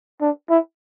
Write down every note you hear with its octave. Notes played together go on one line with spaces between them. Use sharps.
D4
E4